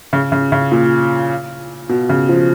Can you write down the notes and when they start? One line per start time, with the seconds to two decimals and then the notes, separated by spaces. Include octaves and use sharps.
0.13 C#3
0.32 C#3
0.52 C#3
0.71 A#2
1.89 B2
2.09 C#3
2.29 F3